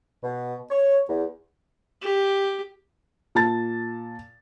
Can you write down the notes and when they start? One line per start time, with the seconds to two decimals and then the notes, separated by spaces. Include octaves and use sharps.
0.23 B2
0.69 C#5
1.08 E2
2.02 G4
3.35 A#2 A5 A6